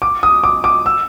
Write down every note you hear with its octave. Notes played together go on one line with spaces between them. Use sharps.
D6
D#6
D6
D6
E6